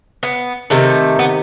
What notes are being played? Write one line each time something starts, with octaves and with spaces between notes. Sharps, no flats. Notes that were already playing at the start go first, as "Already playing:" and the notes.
B3
C3 D#3 A3
B3